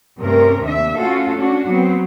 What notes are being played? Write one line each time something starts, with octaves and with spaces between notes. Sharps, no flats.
G2 C3 A3 C#4 A#4
D#2 D4 E5
A3 C#4 F4 F#4 A4
C#4 D4 F#4
F#3 B3 C4